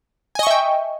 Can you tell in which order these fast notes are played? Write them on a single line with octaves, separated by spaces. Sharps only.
G#5 D#5 C#6 E5 G5